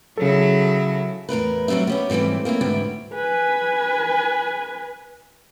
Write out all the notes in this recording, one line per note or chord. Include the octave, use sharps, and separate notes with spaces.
C#3 F#3 E4 A4
E2 A2 A#4 B4
F#3 G3 C4 D#4 E5
B3 C#4 G4
G#2 E3 G3 A3 C4
A#3 C4 C#4 E4
D2 G#2 E3 B3 E4 G5
B4 G#5